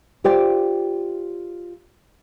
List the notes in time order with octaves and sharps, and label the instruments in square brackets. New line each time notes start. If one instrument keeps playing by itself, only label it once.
[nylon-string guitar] F4 G4 C5 D5 F5 G5